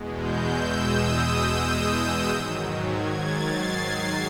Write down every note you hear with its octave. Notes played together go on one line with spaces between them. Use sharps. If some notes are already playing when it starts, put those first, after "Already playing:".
Already playing: E2 B2 G#3
G6
E6
D#6
E6
G#2 D#3 F#3
G#6
A6
C7
C7